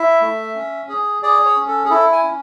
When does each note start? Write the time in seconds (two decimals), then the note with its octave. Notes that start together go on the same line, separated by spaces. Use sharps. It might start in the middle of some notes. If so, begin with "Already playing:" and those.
Already playing: E4 E5
0.22 A3
0.55 C#4
0.89 G#4
1.23 G#4 D5
1.45 C#5
1.57 C#4
1.68 A4
1.85 G#4
1.90 E4 A4
2.12 G#5
2.24 C#4